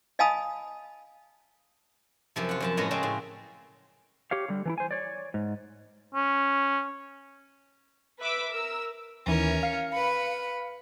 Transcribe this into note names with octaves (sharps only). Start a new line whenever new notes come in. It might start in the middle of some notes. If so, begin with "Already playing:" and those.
D#5 F5 G#5 A5 B5 D#6
F#2 C3 F3
F4 F#5
F#2 F3 A5
A2 G#3 B3 C#4 F#4 A#5
C#3 G#3 C4 A5
A2
G4 C#5 F5
D3 G3
E3 D4 E4
C5 G#5
C#5 D5
G#2
C#4
B4 E5 D6 E6 B6
A#4 E6
D#2 E3 C#4 A#4
F5 C#7
B4 B5